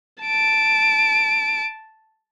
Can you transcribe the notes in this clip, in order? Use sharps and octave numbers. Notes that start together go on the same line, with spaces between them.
A5 D7